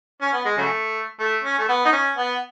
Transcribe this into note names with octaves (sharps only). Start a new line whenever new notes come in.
C#4
B3
G#3
C#3 F#3 A3
A3
C#4
A3
B3
D#4
C#4
B3